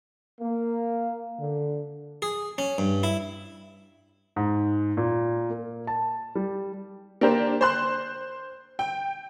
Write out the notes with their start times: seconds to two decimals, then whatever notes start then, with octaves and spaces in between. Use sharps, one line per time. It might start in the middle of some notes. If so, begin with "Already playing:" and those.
0.41 A#3
1.39 D3
2.22 G#4
2.58 C#4
2.78 G2
3.03 E4
4.36 G#2
4.97 A#2
5.50 A#3
5.87 A5
6.35 G3
7.21 A#3 D4 G4 A#4 C5
7.61 C5 C6 F#6
8.79 G5